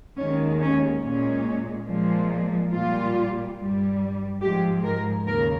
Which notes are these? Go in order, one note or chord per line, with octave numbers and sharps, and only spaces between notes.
D#2 D#3 G#3 C#4
C#4
A#2 G#3 C#4
A#2 F3 G#3
A#2 G3 F4
G2 G3
G#2 F3 G#3 G4
A#4
D#2 C#3 A#4